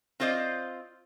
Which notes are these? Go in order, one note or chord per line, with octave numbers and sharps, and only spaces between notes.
C4 F4 C5 D5 D#5